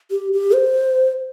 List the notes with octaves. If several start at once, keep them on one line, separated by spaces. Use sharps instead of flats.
G4
G4
C5